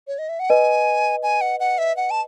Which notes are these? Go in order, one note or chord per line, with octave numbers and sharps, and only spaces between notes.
C#5
D#5
E5
F#5
B4 D#5 G#5
G#5
F#5
F#5
E5
F#5
A5